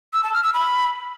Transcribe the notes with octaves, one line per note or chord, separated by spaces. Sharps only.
E6
A5
F6
E6
B5